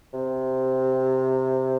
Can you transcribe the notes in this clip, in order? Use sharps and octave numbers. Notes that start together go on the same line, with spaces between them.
C3